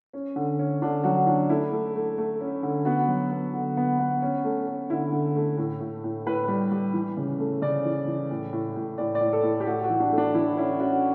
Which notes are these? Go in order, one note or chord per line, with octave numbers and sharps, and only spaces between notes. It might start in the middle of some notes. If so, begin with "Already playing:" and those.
C#4
D3
C#4
D3 D4
F#3 F#4
C#4 D4
A3 E4
A3
A3
A3
C#4
D3
B3 F#4
F#3
B3
D3
B3
B3
C#4
A3
C#4
D3 E4
D3
A3
A2
A2
A2
A2 B4
G3
G3
E3
C#3
A3
C#3 D5
E3
E3
A2
A2
A2
A2 D5
D5
A2
A4
A2
G4
A3 F#4
F#4
E3
D4
A3
D4
E3 E4
C#4 E4
C#4 F#4